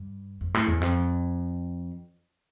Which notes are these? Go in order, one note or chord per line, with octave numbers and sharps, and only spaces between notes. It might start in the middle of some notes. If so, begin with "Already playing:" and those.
Already playing: G2
F2
A2
E2
F2